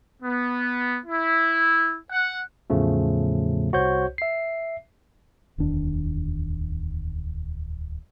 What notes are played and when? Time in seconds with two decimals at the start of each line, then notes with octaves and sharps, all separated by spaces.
0.22 B3
1.07 E4
2.12 F#5
2.70 E2 A2 C#3 F3 A3
3.73 C2 F#4 C5 C#5 G6
4.18 E5 C7
5.58 D1 E2 D#3 D4